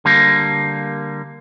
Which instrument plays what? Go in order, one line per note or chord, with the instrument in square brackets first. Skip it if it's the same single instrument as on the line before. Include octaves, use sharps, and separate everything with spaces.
[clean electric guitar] D3 G3 A#3